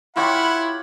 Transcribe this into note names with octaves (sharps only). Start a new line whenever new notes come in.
E4 F4 G4 C#5 F#5 B5